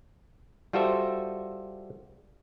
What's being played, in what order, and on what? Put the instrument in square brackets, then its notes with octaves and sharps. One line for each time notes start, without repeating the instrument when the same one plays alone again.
[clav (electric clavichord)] G3 F4 F#4 A4 C5 E5